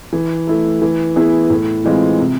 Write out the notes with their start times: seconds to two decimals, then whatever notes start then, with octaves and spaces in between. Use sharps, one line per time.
0.13 E3
0.47 A3 E4
0.82 E3
1.16 B3 E4 G#4
1.50 A2
1.85 E3 G#3 C4 F4
2.19 C3